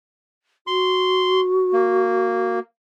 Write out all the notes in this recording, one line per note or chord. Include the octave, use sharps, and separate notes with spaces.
F#4 C6
A#3